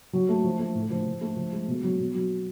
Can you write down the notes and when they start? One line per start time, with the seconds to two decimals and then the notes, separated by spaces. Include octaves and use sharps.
0.13 F#3
0.29 A3
0.44 F3
0.59 A3
0.75 A2
0.90 F3
1.05 F3
1.21 A3
1.36 F3
1.52 G#3
1.68 B2
1.83 F#3
1.99 B2
2.15 F#3